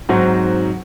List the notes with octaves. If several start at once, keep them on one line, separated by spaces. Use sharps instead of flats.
G#2 F#3 C4 D#4 F#4